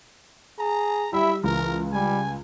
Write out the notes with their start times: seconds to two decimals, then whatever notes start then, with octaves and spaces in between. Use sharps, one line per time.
0.59 G#4 A#5
1.13 G3 E4 E5
1.44 C#2 E3 A#4
1.93 G3 G#5